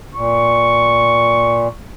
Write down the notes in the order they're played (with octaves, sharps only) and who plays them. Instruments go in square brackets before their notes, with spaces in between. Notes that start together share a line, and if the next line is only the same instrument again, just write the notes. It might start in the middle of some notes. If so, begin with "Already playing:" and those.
[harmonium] A#2 [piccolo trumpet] C#6